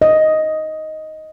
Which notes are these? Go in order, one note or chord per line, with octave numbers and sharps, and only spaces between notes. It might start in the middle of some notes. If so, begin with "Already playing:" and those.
D#5